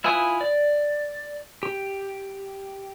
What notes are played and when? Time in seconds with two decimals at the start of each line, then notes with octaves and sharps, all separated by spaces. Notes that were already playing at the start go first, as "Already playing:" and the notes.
0.04 E4 F4 B4 G#5 D#6
0.41 D5
1.63 G4